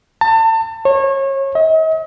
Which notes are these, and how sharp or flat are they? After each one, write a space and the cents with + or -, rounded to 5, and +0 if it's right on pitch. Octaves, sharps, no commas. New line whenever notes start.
A5 +35
C#5 -30
D#5 +45